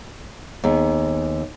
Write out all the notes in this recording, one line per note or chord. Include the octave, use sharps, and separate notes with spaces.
D#2 B3 G#4